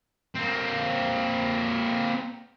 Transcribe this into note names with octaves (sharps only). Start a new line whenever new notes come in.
A#3 C4